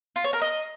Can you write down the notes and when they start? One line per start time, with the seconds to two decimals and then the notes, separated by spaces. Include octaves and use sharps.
0.16 F4
0.24 C#5
0.33 A#4
0.42 D#5